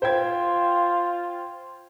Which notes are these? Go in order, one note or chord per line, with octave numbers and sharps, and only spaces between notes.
F4 C5 G5 G#6